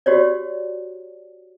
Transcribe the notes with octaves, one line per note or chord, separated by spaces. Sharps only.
F#4 G4 C#5 D5